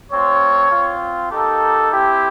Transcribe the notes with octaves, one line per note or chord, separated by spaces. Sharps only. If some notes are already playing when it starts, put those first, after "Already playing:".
A3 C4 F4 C#5
C4 F4
A#3 D#4 G4 A4
C4 E4 G4